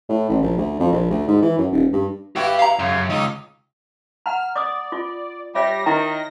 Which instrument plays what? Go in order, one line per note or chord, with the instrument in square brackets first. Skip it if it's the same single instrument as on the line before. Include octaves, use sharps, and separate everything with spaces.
[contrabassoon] A2
A1
A#1
D2
F2
A#1
D2
G#2
E3
F#2
D#1
G2
[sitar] G2 E4 F#4 [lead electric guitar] G4 G5
[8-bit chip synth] F5 A#5
[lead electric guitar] F#2 [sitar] C#3
[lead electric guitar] C#2 [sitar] D#4
[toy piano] F#5 A#5 [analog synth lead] F6
[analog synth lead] D5 [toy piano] D6 D#6
[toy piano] F4
[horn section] G3 [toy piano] C#5 E5 [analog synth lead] A#6
[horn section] D#3 [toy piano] E4 G5 A#5